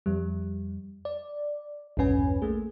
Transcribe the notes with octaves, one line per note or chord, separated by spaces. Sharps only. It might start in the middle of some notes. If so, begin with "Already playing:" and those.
F2 G3
D5
A#1 E2 G2 C#4 B4 G#5
A3 A#3 G#4